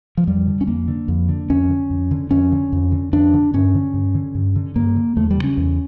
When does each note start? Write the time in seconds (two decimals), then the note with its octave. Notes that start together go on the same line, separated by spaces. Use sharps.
0.17 F3
0.27 F2 G3
0.47 D3
0.61 C#4
0.67 F2 A#3
0.88 D3
1.08 F2
1.29 D3
1.50 F2 C#4
1.69 D3
1.90 F2
2.11 D3
2.31 F2 C#4
2.52 D3
2.72 F2
2.92 D3
3.13 F2 D4
3.34 D3
3.54 G2 C#4
3.75 D3
3.94 G2
4.15 D3
4.35 G2
4.56 D3
4.76 G2 A#3
4.96 D3
5.17 E2 A3
5.31 G3
5.37 C#3
5.44 C#4
5.57 E2